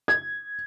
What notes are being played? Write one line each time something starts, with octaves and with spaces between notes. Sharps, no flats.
G#6